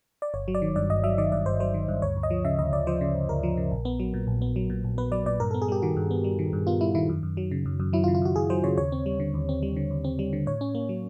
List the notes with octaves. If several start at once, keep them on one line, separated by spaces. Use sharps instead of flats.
D5
G1 C#5
F#3
D5
D#3
G2 D5
G1 D#5
F#3 E5
D#3 D5
G2 D5
G1 C5
F#3 C5
D#3
G2
D2 C#5
D2
D#5
F3
C#3 E5
D2 D#5
D2 D5
F3 C5
C#3
D2
D2 A#4
F3
C#3
A#1
B3
F#3
A#2
A#1
B3
F#3
A#2
A#1
B3 B4
F#3 D5
A#2 D5
G2 A#4
B3 A4
G#4
G3 G4
D#3 F#4
G2
B3
G3
D#3
G2
B3 F4
G3 E4
D#3 E4
F#2
F#2
F#3
C#3
F#2
F#2
F#3 E4
F4
C#3
F4
F#2 F#4
F#2 G#4
F#3 C5
C#3 C#5
D#2 C#5
C4
G3
D3
D#2
C4
G3
D3
D#2
C4
G3
D3
A2 C#5
C#4
A#3
F#3